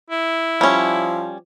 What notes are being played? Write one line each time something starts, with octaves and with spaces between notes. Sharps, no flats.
E4
F3 G3 C#4